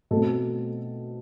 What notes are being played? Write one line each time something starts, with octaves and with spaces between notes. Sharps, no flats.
B2 A3 C4 A4